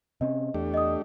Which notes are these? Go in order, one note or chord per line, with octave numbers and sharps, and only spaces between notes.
C3 C4 C#4 D#5
E2 A3 D4 G4
D#5 D#6